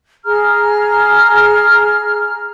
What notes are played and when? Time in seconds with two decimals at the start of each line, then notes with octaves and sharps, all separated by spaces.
0.25 G#4 A#5 F6